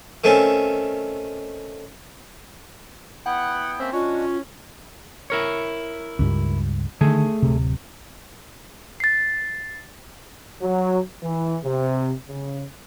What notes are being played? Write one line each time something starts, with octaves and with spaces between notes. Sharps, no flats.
D#3 A3 C4 C#4
B3 E4 F#5 G5
A#3 C4 C#4 E5
G#3 C#4 D4 F4 F#4
E4 A#4 C#5
C#2 G2
D3 D#3 A3 G#4
D1 C3
A6 C7
F#3
E3
C3
C#3